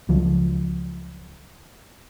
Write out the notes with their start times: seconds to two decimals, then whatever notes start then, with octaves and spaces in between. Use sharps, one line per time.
0.09 C#2 F3 F#3